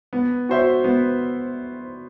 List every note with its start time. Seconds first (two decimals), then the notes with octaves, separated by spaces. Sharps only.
0.13 B3
0.49 F#4 C5 E5
0.84 B3